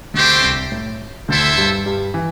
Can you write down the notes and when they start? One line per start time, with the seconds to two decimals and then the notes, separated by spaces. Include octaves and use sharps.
0.14 D2 D3 A3 C4 G4 C5
0.42 C2 C3
0.72 A2
1.28 D2 D3 E4 A4 C5 E5
1.58 G2 G3
1.86 G2 G3
2.14 E3